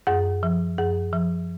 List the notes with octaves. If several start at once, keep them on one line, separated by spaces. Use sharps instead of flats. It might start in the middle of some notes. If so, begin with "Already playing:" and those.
F#2 G#4
F3
F#2 G#4
F3